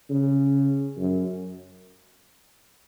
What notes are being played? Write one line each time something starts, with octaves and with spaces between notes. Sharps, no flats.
C#3
F#2